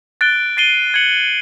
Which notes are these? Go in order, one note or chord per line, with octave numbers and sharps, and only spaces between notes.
F#6 A6 D7 G7
A6 C7 D#7 G7
G#6 C#7 F#7